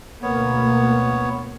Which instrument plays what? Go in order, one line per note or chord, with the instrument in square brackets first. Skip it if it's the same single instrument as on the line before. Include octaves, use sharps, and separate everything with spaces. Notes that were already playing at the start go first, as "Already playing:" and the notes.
[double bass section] D2 B2 A#3 [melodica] B3 C#5